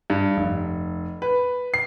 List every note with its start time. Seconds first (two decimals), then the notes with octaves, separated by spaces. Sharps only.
0.10 G2
0.37 F1
1.22 B4
1.74 C7